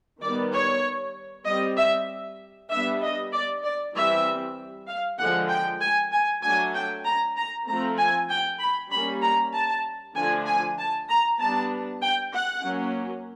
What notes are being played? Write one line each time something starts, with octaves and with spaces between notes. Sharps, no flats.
D#3 G3 B3 D5
C#5
G3 C4 D#5
E5
G3 B3 D4 E5
D#5
D5
D5
E3 G3 C4 E5
F5
D3 F3 G#3 F#5
G5
G#5
G#5
F#3 A3 D4 G#5
G5
A#5
A#5
F3 A3 C4 A#5
G#5
G5
B5
G3 A#3 C#4 B5
A#5
A5
D3 F3 A3 D4 G#5
G#5
A5
A#5
G3 B3 D4 A5
G5
F#5
F#3 A#3 C#4